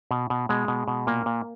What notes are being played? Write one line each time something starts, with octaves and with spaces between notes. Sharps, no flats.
B2
B2
B2 G#3
B2
B2
A#2 A#3
A#2